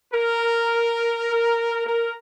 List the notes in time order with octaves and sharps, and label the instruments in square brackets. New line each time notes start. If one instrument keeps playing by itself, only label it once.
[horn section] A#4
A#4